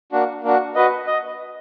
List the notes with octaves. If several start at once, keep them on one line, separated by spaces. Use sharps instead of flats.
A#3 D4 F#4
A#3 D4 F#4
F#4 B4 D#5
D#5